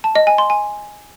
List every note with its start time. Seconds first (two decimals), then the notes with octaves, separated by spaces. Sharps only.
0.04 A5
0.15 D#5
0.27 G#5
0.38 C6
0.50 G#5